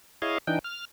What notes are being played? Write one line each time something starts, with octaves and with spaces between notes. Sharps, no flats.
E4 G#4 C#5 D#5 F5
E3 D4 D#4 G5
F6